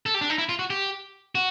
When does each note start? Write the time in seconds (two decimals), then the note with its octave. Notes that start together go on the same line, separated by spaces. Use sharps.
0.06 A4
0.14 G4
0.21 D4
0.30 D#4
0.38 E4
0.49 F4
0.59 F#4
0.70 G4
1.35 F#4